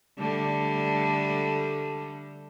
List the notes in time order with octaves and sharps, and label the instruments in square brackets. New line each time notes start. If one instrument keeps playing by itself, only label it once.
[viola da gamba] D3 G3 A3